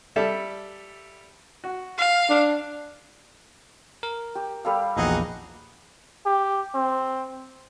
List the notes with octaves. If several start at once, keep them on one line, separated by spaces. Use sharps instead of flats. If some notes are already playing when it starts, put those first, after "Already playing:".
G3 A4 E5
F#4
F5
D4
A#4
G4
G3 A4 F5
A#1 E2 A#2 D#4 F#4 G#4
G4
C4